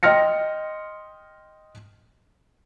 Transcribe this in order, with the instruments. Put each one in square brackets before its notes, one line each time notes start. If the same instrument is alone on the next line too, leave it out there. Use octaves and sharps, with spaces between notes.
[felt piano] D#5 G5 C6 F6 A#6 C#7